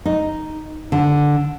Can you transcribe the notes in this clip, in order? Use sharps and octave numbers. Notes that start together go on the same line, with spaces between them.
D#4
D3